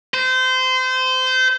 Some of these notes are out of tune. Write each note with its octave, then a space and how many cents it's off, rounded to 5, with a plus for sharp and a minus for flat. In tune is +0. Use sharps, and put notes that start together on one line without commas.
C5 -25